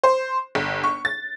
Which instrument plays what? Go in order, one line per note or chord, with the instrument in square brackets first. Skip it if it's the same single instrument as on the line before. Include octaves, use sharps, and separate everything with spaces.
[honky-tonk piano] C5
G1
C#6
A6